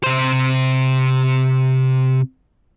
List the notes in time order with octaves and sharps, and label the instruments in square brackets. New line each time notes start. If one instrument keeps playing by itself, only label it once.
[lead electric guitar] C3 C5